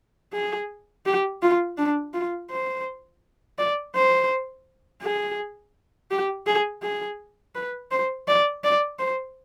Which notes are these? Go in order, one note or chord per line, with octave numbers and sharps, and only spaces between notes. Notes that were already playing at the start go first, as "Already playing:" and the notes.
G#4
G4
F4
D4
F4
C5
D5
C5
G#4
G4
G#4
G#4
B4
C5
D5
D5
C5